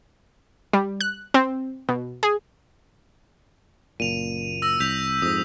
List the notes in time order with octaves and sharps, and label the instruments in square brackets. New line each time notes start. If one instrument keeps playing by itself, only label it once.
[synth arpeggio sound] G3
F#6
C4
B2
G#4
[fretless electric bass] F#1 A#2 [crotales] D#7 F7
[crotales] E6 A#6
[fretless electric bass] C2 [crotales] G6 B6 F7
[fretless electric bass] F2 G#2 [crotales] D#6